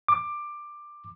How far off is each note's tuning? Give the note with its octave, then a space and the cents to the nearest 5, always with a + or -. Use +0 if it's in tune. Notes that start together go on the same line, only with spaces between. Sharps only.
D6 +15